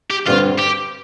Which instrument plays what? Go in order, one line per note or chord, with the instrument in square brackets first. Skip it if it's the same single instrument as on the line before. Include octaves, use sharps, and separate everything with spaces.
[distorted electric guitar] G4
[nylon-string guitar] G2 D3 G3 C4 [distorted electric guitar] F4
[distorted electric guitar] G4